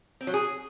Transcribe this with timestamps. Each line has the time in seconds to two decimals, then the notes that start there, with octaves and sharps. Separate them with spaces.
0.21 C4
0.27 F#3
0.34 G#4